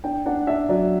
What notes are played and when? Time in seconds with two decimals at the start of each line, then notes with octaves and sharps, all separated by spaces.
0.04 D4 G5
0.26 D4 F#5
0.47 D4 E5
0.69 F#3 D5